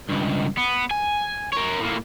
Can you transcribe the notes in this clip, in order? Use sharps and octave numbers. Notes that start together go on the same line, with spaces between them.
C#2 G2
B3
G#5
A#4 C#5
A2 A#3